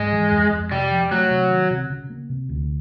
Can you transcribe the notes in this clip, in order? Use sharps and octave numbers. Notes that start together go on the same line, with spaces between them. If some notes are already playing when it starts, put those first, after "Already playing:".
Already playing: G#2 G#3
E3
F2
F2
C3 G3
F3
F#3 A3
C3
D#3
C3
C#3
A#3
C3
D2